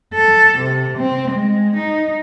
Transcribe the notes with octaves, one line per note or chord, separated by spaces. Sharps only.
A4
C3
C4
G#3
D#4